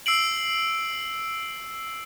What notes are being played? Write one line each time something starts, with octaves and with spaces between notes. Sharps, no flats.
E6 C7 D7 F#7